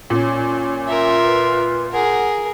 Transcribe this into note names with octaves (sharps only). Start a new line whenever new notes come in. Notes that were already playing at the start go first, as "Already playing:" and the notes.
A#2 C#4
F4 A#4 E5
B4
G#4 A#4 F#5